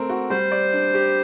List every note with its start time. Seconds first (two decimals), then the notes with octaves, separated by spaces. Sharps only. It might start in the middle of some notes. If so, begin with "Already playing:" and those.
Already playing: A3 C4 A#4
0.09 F#4
0.30 G3 C5
0.51 D5
0.73 D4
0.94 G4